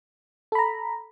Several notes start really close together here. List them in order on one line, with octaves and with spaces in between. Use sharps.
A4 B5 A#5